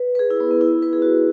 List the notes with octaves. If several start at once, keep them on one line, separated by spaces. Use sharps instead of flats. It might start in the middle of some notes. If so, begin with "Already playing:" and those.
Already playing: B4
B4
G#4
E4
B3
B3
E4
B4
G#4
F#4